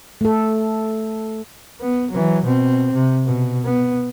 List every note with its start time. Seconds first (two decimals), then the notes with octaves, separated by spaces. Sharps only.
0.21 A3 A4
1.81 B3
2.11 E3 F#3
2.44 B2 C4
2.93 C3
3.26 B2
3.65 B3